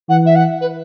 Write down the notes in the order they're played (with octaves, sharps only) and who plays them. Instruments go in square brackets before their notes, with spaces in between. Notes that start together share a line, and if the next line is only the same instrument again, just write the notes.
[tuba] E3 [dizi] F#5
[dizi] E5
F#5
B4